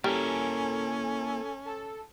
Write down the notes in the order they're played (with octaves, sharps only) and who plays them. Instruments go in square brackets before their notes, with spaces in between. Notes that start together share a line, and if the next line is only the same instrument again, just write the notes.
[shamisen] G3 [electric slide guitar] A#3 E4 A#4 [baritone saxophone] C#4 [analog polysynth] A4 G#5
[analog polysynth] A4